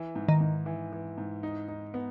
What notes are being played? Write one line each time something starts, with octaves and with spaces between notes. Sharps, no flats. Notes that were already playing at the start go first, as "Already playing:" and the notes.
Already playing: E3
G#2
D#3
G#2
E3
E3
G#2
D#4
D#4
B3